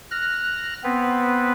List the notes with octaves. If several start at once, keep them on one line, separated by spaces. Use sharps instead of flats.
F6 F#6 A#6
B3 C4 B4